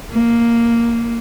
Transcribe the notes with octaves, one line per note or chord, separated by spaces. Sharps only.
A#3